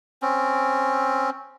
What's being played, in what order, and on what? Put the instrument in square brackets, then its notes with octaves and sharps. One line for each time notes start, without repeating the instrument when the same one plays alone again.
[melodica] C4 C#4